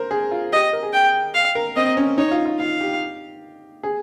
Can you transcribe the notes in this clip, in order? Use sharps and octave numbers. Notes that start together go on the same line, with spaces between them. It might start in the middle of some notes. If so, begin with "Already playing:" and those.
Already playing: A#4 C5
G#4
F4
G4 D#5
A#4
G#4
G5
F5
A#4
C4 D#5
C#4
D#4 C#5
F4
F4
F4 F5
G4
G#4